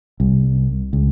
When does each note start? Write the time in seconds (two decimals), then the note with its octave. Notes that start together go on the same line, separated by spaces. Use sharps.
0.20 C2
0.93 C#2